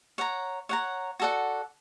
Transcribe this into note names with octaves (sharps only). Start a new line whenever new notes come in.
C#5 F#5 A#5
C#5 F#5 A#5
F#4 A4 D5 F#5